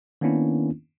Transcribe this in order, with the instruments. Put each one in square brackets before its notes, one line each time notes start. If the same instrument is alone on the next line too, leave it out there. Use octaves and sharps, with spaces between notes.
[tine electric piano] D#3 A#3 B3 C#4 D4 E4